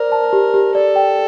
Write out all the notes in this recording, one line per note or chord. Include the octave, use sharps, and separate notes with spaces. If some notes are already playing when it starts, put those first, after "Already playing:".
Already playing: A#4 C5 D5
A5
G4
G4
A4 D5
G5